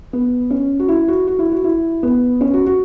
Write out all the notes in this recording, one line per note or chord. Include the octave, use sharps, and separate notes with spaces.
B3
C#4
F#4
E4
F#4
F#4
E4
F#4
E4
B3
C#4
F#4
F#4